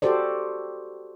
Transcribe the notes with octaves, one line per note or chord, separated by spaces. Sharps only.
F#4 G4 A4 C5 D5